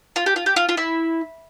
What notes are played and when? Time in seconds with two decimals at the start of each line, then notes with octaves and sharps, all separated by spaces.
0.16 F4
0.26 G4
0.36 F4
0.46 G4
0.56 F4
0.69 F4
0.77 E4